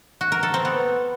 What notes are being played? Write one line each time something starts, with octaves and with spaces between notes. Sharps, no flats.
F#4
A#4
A4
C4
B3